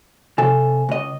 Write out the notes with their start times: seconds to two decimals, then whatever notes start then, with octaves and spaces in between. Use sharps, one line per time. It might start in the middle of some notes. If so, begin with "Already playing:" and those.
0.38 C3 A4 G#5
0.89 C#2 D#5